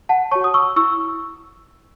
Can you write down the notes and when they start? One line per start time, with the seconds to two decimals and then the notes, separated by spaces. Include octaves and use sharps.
0.09 F#5 A5
0.31 C#5 A5 C#6
0.35 F#4
0.44 D#6
0.54 C#6 E6
0.76 E4 C#6 E6